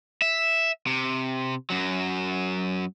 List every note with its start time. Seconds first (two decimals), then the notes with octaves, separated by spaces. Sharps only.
0.22 E5
0.87 C3
1.70 F#2 F#3